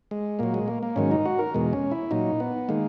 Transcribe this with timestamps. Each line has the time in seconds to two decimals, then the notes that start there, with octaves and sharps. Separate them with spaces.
0.11 G#3
0.39 A#2 F#3 A#3
0.54 G#3
0.68 A#3
0.83 A#3
0.96 G#2 D#3 F#3 C#4
1.11 D#4
1.25 F#4
1.39 A#4
1.54 E2 B2 G#3
1.73 C#4
1.91 E4
2.11 A#2 F#3 D#4
2.40 B3
2.69 D#3 G#3 A#3